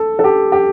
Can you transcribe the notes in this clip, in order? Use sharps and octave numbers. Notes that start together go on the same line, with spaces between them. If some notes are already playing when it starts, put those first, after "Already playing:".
Already playing: A4
A4
G4
G4